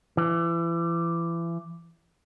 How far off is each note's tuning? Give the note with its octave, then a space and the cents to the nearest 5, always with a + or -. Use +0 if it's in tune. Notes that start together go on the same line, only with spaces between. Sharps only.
E3 +30